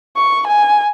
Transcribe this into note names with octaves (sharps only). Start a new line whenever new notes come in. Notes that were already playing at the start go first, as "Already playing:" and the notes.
C#6
G#5